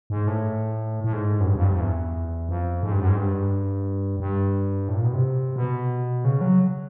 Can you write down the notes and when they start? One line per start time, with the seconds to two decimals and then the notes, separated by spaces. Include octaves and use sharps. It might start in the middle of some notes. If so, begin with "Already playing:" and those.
0.10 G#2
0.27 A2
1.04 A2
1.13 G#2
1.40 F#2
1.47 G2
1.55 F2
1.64 G2
1.73 F2
1.81 E2
2.49 F2
2.83 G#2
2.91 G2
3.00 F#2
3.09 G#2
3.17 G2
4.20 G2
4.89 A2
4.96 A#2
5.05 B2
5.13 C3
5.56 B2
6.25 C#3
6.41 F#3